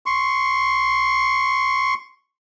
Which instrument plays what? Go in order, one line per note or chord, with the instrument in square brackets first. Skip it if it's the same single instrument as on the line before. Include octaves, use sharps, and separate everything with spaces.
[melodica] C6 C#6